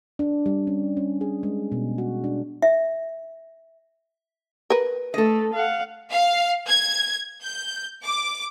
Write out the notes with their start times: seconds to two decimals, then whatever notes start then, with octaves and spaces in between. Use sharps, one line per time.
0.19 D4
0.46 G3
0.67 C#4
0.97 C#4
1.21 G#4
1.43 G#3
1.72 B2
1.98 F#4
2.24 D4
2.62 E5
4.70 A#4 B4
5.14 A3 A4 D#5
5.54 F5 F#5
6.11 F5
6.68 G#6
7.42 G6
8.03 D6